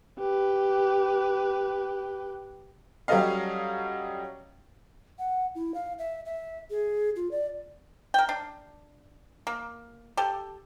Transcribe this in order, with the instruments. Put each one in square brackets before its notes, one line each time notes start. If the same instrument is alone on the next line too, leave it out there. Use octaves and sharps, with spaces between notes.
[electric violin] G4 B4
[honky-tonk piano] F#3 G3 C#4 A4 D#5 F5
[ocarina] F#5
E4
F5
E5
E5
G#4
F4
D5
[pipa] A#4 G5
D4
A#3
G4 A4